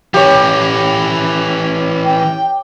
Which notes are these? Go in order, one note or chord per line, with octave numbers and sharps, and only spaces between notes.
E3 C#4 G4 C#5
G5